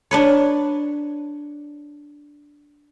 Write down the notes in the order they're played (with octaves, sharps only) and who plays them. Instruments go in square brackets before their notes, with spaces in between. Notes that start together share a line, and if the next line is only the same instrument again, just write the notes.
[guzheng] D4 B4 C#5